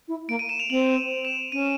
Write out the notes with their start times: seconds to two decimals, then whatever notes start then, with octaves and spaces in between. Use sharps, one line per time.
0.08 E4
0.28 A#3 D7
0.39 D#7
0.49 E7
0.60 F7
0.70 C4 F#7
1.25 E7
1.52 C#4 D#7